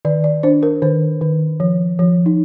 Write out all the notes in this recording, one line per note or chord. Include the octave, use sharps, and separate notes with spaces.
D#3 D5
D5
D4 C5
A#4
D#3 C5
D#3
F3
F3
D#4